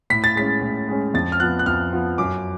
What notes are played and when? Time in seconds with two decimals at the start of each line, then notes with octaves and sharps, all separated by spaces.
0.10 A2 B6
0.24 A6
0.36 G#3 C#4 B6
0.61 A2
0.88 G#3 C#4
1.14 F2 A6
1.32 F6
1.40 F3 B3 F#6
1.59 F#6
1.66 F2 F6
1.92 F3 B3
2.18 F#2 D6